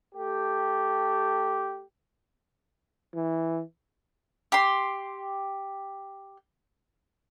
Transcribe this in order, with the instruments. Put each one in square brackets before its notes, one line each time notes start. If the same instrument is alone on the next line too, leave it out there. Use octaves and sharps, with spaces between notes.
[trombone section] A3 G4
[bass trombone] E3
[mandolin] G4 C6